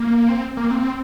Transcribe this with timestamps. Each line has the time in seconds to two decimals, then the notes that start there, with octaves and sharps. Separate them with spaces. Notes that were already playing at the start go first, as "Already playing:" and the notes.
Already playing: A#3
0.29 C4
0.57 A#3
0.71 C4